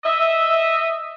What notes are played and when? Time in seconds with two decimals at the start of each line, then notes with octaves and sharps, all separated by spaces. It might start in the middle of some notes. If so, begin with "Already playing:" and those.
0.04 D#5 E5